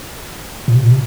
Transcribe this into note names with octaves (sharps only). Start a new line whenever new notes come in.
A#2
C3
A#2
C3